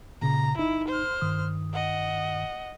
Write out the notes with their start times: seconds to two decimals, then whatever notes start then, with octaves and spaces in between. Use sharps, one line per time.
0.22 A#2 C#3 A#5
0.57 G1 D#4 E4
0.88 C5 F6
1.21 G2 D#3 D#6
1.73 D#5 F#5